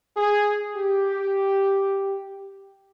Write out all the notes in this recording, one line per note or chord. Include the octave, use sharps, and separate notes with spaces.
G#4
G4